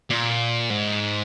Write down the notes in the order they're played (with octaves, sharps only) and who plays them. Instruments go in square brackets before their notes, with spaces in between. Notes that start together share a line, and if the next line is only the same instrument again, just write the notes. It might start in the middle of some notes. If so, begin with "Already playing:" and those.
[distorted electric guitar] A#2
G#2